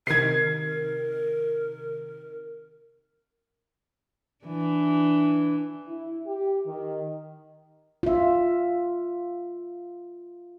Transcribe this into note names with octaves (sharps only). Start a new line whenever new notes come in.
C3 D#3 A#4 G#6 C7
E3 D4
E4
G4
D#3
F4 E5